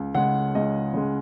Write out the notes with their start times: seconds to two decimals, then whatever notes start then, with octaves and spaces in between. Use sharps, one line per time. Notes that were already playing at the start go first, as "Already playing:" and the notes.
Already playing: C#2
0.15 C#3 G#3 F#5
0.55 C#2 D#5
0.94 C#3 G#3